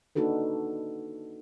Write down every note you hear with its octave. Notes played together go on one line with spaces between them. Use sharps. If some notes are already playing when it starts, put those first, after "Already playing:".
A#3 D4 D#4 F#4 A4 B4